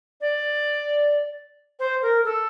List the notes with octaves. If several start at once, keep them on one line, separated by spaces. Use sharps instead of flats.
D5
C5
A#4
A4